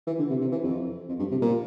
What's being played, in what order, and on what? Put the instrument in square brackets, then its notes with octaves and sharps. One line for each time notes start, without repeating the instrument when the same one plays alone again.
[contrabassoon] E3
D3
C3
C3
E3
F2
F2
G2
C3
A#2